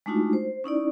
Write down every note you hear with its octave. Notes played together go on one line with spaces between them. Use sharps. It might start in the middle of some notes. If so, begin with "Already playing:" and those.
G#3 A3 D4 D#4 F4 F#4
C5
C#4 D#4 E4 D5